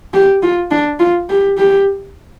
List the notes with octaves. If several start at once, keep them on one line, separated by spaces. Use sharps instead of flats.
G4
F4
D4
F4
G4
G4